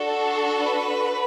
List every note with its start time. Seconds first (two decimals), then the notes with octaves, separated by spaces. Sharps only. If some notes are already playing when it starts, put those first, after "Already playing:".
Already playing: D4 F#4 A4
0.60 B4